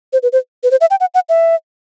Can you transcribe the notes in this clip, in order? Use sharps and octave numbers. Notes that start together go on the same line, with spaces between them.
C5
B4
C5
B4
C5
E5
G5
F#5
F#5
E5